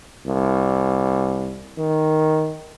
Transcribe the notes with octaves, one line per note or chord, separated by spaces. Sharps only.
C2
D#3